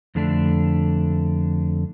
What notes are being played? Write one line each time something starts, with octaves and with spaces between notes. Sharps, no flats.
F2 D3 A3 D4